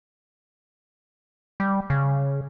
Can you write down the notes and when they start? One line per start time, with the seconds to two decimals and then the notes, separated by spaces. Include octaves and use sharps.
1.60 G3
1.90 C#3